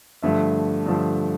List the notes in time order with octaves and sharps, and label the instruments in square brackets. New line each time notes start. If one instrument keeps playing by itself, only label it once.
[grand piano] G2 D3 F3 A3 E5
G2 D3 F3 A3